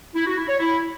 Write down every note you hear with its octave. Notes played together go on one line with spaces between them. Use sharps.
E4
F#4
E4
C#5
E4